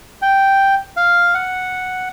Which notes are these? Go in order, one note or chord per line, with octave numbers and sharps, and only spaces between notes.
G5
F5
F#5